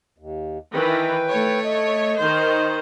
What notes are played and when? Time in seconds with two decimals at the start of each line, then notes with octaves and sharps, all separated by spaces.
0.18 D#2
0.75 D#3 E3 B4 G5
1.30 A3 C#5
1.65 D#5
2.18 D#3 C5